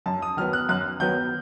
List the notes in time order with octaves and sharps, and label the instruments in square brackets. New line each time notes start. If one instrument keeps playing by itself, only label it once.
[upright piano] F#2 [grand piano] A5
[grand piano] D#6
[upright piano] D#3 F#3 B3 [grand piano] F6
[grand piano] F#6
[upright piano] F#2 [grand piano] F#6
[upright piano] D#3 F#3 B3 [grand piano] G6